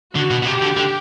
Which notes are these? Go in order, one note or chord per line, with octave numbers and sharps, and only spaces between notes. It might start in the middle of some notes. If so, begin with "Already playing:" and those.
D3 F#4
B2
B2
C3 G4
D3
D3